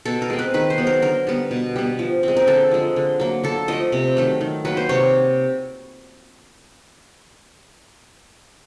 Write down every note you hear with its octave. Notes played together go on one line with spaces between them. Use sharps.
B2 A4
A#4
G#3 C4
B4
D#3 B4
C5
F#3 B3
A#4
D3 A#4
G3 B3
B2
G3 B3
F3
G#3 C4
A#4
D3 A4
F3 G#3
D3
F#3 A#3
D3 A4
F3 A3 D#5
C3
D#3 F#3 A3
D#3
F#3 A#3 B4
C5
C3 C#5